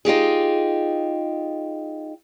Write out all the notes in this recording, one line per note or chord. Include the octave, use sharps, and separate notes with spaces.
D#4 F4 G4 G#4